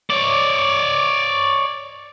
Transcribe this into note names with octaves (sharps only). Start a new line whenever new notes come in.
C#5 D5